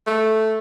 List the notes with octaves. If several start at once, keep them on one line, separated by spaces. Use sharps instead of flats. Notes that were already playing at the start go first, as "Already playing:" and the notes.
A3